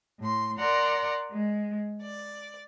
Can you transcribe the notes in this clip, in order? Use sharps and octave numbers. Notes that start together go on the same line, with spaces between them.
A2 C6
A#4 D5 F#5 A#5 C6
G#3
D5